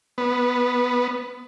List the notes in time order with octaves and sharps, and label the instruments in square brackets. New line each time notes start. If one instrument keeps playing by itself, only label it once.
[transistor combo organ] B3